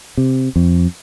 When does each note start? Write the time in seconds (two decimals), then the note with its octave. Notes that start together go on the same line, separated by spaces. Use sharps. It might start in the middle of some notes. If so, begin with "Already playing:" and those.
0.17 C3
0.56 F2